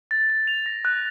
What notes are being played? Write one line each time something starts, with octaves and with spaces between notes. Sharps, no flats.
A6
A6
F7
A#6
F#6